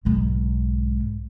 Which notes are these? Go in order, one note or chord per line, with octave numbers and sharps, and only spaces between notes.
B1 G#2